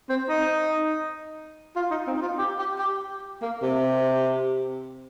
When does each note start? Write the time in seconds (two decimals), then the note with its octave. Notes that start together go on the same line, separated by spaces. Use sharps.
0.09 C4
0.29 D#4
1.76 F4
1.91 D#4
2.07 C4
2.16 D#4
2.22 F4
2.38 G4
2.59 G4
2.79 G4
3.42 A#3
3.62 C3